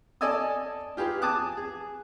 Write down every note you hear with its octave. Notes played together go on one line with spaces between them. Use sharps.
A4 D5 D#5 G#5 A5 E6
F4 G4 G#4 B4
G#5 A5 D6 D#6 F#6
G#4